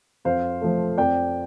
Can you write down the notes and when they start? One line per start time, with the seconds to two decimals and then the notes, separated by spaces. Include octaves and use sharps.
0.25 F2 C5 F5
0.61 F3 A3
0.98 F2 D5 G5